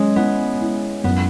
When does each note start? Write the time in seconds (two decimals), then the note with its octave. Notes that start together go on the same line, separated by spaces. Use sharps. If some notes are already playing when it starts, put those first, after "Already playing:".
Already playing: G#3 C#4
0.16 B3 E4
0.61 E4
1.04 F#2 B3